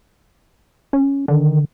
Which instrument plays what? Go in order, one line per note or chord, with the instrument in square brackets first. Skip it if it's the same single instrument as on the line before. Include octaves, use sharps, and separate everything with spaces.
[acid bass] C#4
[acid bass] D3 [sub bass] D#3